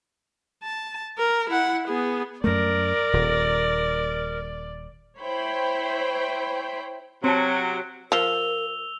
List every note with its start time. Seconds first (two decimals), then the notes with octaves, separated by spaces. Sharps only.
0.63 A5
1.18 A#4
1.50 E4 F#5
1.87 B3 G#4
2.44 F#2 A3 A#4 D5
3.13 D#1
5.19 E4 C5 C#5 G5 B5 C6
7.24 C3 F#3 C4 A5
8.12 F3 A#4 E6 F7 G7